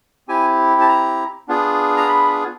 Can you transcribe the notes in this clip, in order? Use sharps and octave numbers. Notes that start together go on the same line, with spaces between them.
C4 E4 G4 G#5
A5
A#5
B3 D4 F4 G#4
A#5
B5